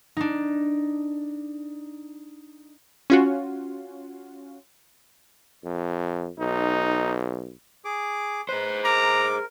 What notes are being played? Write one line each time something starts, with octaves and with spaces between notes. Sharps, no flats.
D4 D#4
C#4 F4 F#4
F2
B1 D#4
G#4 D6
G#4 B4 C5
A#4 A#5 D6